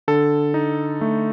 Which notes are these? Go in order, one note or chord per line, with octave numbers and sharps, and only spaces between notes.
D3 A4
D#4
A3